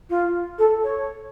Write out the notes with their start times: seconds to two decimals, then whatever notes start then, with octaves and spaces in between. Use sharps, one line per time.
0.09 F4
0.58 A4
0.83 C#5